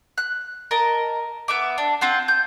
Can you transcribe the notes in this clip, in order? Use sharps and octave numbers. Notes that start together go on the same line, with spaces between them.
F#6
A#4 D#5 A5
B3 E5 D6
D4
C4 F4 F#5
G6